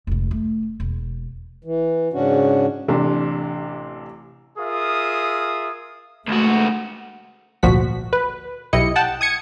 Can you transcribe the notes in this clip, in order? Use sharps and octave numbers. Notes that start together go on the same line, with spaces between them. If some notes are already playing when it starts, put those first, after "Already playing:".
F1 G#2
A3
E1
E3
G#2 C#3 C#4 D4 F#4
A1 C3 D4
F4 G#4 A#4 E5 D#6
C#2 A3 F#4
G#1 D2 A#2 F3 F#4 B6
B4
B1 B2 E4 G4 D#5 C#7
F#5 G5 A5
D#6 G#6 C#7